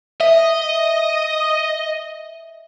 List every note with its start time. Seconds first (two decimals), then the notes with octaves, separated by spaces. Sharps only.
0.20 D#5 E5